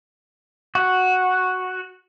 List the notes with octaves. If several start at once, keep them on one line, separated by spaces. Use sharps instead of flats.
F#4